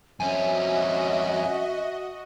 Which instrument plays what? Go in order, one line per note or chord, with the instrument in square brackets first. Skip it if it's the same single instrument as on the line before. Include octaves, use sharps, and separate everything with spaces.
[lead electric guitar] F2 C#4 [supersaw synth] F#4 D#5 [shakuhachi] E5 [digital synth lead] G#5